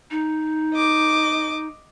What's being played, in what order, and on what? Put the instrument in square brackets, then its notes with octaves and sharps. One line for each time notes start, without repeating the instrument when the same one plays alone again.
[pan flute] D#4
[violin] D#5 D6